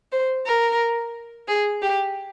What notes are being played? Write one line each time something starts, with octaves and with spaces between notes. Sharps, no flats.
C5
A#4
G#4
G4